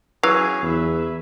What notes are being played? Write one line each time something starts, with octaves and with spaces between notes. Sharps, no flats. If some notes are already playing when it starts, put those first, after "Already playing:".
E3 F#3 C#4 G#4 F5
E2 B4 E5